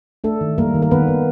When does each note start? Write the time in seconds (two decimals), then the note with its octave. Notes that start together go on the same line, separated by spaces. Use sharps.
0.24 A3 D4 A4
0.41 D#3
0.58 G3 A#3 A#4
0.75 D#3
0.82 A#4
0.91 D#3 B3 B4
1.08 B3